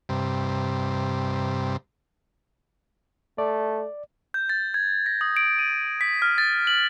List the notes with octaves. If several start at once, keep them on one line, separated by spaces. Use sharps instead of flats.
G2 C3
A3 D5
G6
A6
G#6
A#6
D#6
D7
D#7
B6
F6
A6
F#7